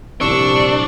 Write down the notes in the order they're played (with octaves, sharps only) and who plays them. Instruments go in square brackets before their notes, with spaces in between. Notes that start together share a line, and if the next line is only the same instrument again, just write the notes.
[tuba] C2 [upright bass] A#2 F3 [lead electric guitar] D4 [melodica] C#6 E6